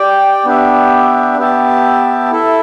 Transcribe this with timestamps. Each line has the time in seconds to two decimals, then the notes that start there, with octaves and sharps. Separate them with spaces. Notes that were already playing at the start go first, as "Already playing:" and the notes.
Already playing: G4 D5 G5
0.45 B3 D4 G4 E5
1.38 B3 G4 E5 A5
2.31 E4 A4 E5